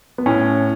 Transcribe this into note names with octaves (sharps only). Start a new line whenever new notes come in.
B3
A2 C#4